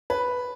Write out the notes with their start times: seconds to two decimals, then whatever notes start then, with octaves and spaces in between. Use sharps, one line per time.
0.10 B4